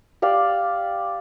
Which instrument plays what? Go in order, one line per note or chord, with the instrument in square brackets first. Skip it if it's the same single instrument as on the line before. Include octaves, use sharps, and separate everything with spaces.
[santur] G4 D5 F5